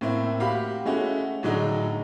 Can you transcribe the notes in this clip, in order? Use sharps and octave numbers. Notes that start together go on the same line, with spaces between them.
A2 A#3 C4 E4
F#4 G4 F5 B5
G#3 A3 C#4 E4 F#4
A2 D3 F#3 G#3 D#4